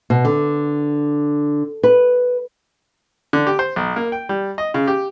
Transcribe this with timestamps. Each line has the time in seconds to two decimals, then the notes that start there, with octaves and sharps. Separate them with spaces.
0.10 B2
0.25 D3
1.83 B4
3.33 D3
3.47 G4
3.59 C5
3.76 B1
3.96 A#3
4.12 G5
4.29 G3
4.58 D#5
4.74 C#3
4.87 G4